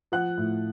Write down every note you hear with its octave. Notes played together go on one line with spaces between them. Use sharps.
F3 F#5 F#6
A2